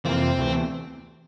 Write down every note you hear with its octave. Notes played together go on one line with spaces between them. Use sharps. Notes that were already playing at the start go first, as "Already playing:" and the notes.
F2 C3 E3 A#3 C4 F4
D2 C3 E3 A3